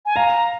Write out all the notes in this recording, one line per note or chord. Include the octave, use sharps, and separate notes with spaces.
G#5
F5 A#5